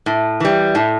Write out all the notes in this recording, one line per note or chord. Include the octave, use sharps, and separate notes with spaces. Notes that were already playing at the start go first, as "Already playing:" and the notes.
A2
E3 G3
A2